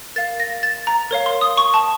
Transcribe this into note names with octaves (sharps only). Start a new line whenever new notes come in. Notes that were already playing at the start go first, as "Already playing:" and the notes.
A#4 F5 A6
A#6
A6
A#5
A#4 C#5 F5
C6
D#6
C#6
A5